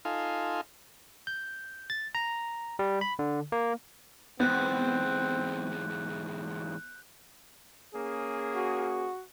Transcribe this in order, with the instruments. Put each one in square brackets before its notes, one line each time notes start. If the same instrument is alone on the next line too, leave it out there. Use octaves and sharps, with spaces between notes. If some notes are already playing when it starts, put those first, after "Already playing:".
[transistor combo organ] D#4 F4 A4 F5 G#5 C6
[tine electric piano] G6
A6
A#5
G3
B5
D3
A#3
[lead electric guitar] E2 G#2 [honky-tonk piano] B3 [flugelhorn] C4 [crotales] F#6 G6
[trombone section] A#3 C#4 G#4
[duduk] F#4